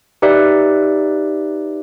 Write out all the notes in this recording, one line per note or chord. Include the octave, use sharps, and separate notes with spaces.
D#4 G4 B4 D5 E5